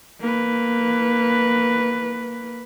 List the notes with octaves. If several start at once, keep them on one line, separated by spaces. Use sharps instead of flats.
A#3 B4